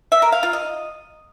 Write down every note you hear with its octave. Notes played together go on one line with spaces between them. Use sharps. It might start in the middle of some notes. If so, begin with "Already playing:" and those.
E5
A#4
F5
F4
D#5